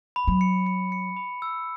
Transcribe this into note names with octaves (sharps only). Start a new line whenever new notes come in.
B5
F#3
C#7
C#7
C#7
B5
E6